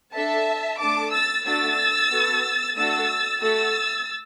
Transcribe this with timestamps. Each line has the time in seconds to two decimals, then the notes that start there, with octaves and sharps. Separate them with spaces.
0.14 D4 A4 E5 A5
0.79 A3 D4 A4 A5 D6
1.12 E6 A6
1.45 A3 D4 F#4 E6 A6
2.11 B3 F#4 A4
2.76 A3 D4 F#4 A4 E6 A6
3.41 A3 F#4 A4 E6 A6